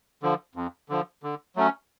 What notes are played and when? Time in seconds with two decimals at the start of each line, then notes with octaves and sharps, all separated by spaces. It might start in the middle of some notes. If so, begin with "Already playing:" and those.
0.23 D3 F3
0.55 F2
0.89 D3 F3
1.23 D3
1.56 F#3 A3 C#4